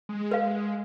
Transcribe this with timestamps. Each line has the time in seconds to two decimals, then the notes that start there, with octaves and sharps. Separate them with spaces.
0.09 G#3
0.31 B4 F5